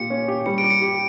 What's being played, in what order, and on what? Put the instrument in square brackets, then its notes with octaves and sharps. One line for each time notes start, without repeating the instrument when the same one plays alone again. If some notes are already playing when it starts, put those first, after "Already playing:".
Already playing: [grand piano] A#2 G4 [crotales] C#7
[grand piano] C#4
G4
[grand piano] G3 [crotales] C#7
[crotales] D7
[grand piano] G4
[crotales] C#7
[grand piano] G4